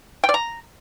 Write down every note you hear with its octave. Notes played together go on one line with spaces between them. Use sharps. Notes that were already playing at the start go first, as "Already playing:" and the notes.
G5
D5
A#5